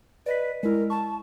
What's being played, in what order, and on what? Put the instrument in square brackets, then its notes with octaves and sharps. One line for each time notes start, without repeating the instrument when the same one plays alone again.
[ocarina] B4 [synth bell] D5 D#5 B6
[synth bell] G#3 E4 [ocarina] A#4
[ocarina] A5 [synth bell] C#6